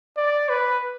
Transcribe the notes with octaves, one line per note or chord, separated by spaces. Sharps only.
D5
B4